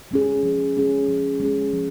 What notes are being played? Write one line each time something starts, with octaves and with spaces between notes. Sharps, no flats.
G#3 C#4 G#4
F3
G#3 C#4 G#4
F3
G#3 C#4 G#4
F3